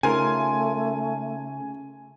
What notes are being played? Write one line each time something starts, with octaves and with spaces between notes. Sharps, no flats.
C#3 A3 D#4 F4 A#4 G#5